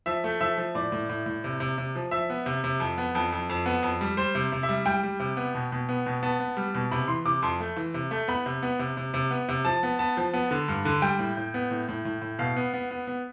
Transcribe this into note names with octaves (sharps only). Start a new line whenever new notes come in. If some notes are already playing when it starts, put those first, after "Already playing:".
F3 E5
A3
F3 E5
F3
A2 D5
A2
A2
A2
C3
C3
C3
F3
F3 E5
B3
C3
C3
F2
B3
F2
F2
F2
B3
F2
G3
G3 C5
C3
C3
E5
G3
G3 G5
G3
C3
B3
B2
B2
B3
B2
B3 A5
B3
G3
B2
C3 B5
E3 C6
C3 D6
F2 C6
A3
E3
C3
A3
B3 B5
C3
B3
C3
C3
C3
B3
C3
F3 A5
B3
B3 A5
F3
B3
D3
G2
D3
G3 G5
A2
A2
B3
A2
A2
A2
A2
B2 F5
B3
B3
B3
B3